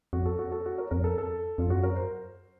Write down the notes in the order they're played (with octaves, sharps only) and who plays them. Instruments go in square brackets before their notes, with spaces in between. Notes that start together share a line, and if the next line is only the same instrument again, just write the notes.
[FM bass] F2 [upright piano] F#4
[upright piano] A4
F#4
A4
F#4
A#4
[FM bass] F2 [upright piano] A#4
[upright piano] A4
A4
[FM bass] F2 [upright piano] F4
[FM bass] F#2 [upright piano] F#4
[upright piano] A#4
C5